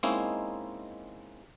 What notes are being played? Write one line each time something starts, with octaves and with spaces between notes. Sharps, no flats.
G#3 A#3 C4 C#4 D#4 E4